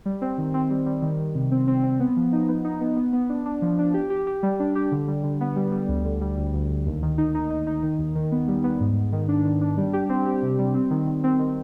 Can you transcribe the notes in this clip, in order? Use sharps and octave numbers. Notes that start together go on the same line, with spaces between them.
G3
C4
D#3
C4
G3
G3
D#3
D#3
C3
C4
C4
C4
B3
F3
D#4
B3
D#4
B3
B3
B3
D4
D4
F3
D4
G4
G4
G4
G3
D4
G4
D3
G3
D3
B3
G3
G3
D2
D3
G3
D2
D2
D2
D#2
D#3
D#4
D#4
D#4
D#4
D#3
D#2
D#3
B3
G3
B3
G#2
G#2
D#3
D4
D#3
D4
G3
G4
C4
G4
C3
G3
C4
D#3
D#3
C4
D#3